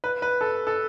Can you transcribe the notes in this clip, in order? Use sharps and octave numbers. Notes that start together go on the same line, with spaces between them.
B4
B4
A4
A4